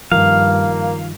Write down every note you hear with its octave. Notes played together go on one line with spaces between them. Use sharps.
G2 D#3 F3 A#3 F5